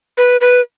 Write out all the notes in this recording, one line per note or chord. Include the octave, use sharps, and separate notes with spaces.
B4
B4